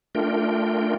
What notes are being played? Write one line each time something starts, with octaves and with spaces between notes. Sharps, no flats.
A3 D4 F4 A#4 G5